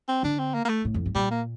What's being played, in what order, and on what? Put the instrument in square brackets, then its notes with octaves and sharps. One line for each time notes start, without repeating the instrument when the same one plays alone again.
[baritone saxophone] C4
[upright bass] D3 [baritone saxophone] D4
[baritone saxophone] C4
A#3
A#3
A3
[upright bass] A2
F2
G2
[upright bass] A#2 [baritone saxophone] G3
[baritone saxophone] A#3